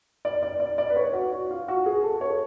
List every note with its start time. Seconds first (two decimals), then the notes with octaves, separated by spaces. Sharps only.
0.25 D5
0.43 D5
0.60 D5
0.78 D5
0.90 B4
0.96 C#5
1.14 F#4
1.33 F#4
1.50 F4
1.68 F#4
1.86 G#4
2.03 A4
2.21 C#5